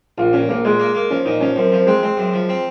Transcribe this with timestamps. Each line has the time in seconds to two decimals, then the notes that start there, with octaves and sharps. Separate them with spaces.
0.18 A#1 F4
0.33 A#2 C#4
0.49 A#1 A#3
0.65 A#2 G#3
0.80 A#3
0.95 A#3
1.10 F3 C#4
1.25 A#2 D#4
1.41 F3 C#4
1.56 F#2 C4
1.72 F3 C4
1.87 G#3 C4
2.03 G#3 C4
2.17 F#2
2.34 F3
2.49 C4